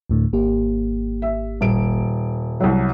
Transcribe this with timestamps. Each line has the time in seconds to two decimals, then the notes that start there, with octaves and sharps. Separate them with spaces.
0.09 D2 A2 D3
0.33 G#1 A#3 G4
1.22 E5
1.61 D#1 D7
2.60 C2 F#3